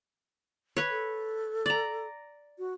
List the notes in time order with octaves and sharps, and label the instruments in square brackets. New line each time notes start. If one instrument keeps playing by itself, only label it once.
[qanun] B4 C#5
[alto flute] A4
[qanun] D5 A#5
[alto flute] F#4